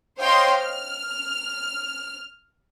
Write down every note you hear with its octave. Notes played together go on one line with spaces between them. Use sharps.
C5 C#5 D#5 F5 G5 C6
F6